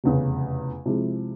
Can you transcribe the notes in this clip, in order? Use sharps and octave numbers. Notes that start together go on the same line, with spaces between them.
F1 E2 C#3
C3 F3 G#3 E4 G#4